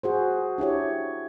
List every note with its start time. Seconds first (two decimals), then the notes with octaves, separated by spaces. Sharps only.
0.03 F#4 G#4 C5
0.58 D4 E4 G4 C#5